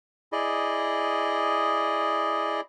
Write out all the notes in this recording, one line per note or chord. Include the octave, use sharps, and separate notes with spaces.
E4 G#4 D5 D#5